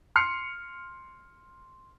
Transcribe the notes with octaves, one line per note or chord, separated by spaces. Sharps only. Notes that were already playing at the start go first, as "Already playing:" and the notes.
C6 F6 C7 C#7